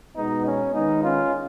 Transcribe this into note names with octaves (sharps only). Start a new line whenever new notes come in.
B2 G#3 B3 D#4
C#4
D#3 G#3 B3 D#4
C#4 F4